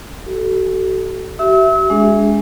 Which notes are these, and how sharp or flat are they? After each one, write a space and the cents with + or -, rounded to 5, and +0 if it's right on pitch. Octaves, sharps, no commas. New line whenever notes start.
F#4 +35 A4 -5
F#4 +45 E5 +0 E6 -40
G#3 +0 D4 -35 G#4 +0